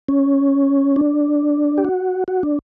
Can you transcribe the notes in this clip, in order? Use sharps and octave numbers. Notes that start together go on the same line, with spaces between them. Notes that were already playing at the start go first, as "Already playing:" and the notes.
C#4
D4
G4
F#4
F#4
D4